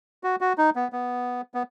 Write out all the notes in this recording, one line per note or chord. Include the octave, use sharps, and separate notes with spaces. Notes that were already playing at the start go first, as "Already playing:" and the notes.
F#4
F#4
D#4
B3
B3
B3